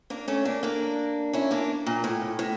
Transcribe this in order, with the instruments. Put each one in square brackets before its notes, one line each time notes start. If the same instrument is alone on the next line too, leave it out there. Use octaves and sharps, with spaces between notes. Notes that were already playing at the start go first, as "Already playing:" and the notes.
[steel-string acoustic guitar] A#3 D4
A3 C#4
A#3 D4
A#3 D4
C#4 E4
A#3 D4
A#2
A2
A2